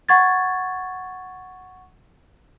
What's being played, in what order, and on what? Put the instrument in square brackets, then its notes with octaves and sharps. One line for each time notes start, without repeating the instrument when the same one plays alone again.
[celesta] F#5 C#6 G#6 A6